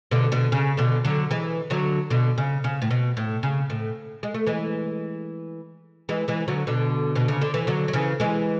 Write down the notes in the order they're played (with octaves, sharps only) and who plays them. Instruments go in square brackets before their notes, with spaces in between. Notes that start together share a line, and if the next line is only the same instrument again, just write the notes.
[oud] B2 D3
B2 D3
C#3
B2 D3
D3 F#3
E3 G#3
D3 F#3
B2 D3
C#3
C#3
A2
B2
A2
C#3
A2
G#3
A3
E3 G#3
E3 G#3
E3 G#3
D3 F#3
B2 D3
B2
C#3
D3
E3
D3 F#3
F#3
C#3 E3
E3 G#3